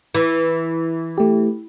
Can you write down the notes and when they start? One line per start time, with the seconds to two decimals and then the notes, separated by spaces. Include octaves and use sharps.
0.14 E3
1.18 A3 G4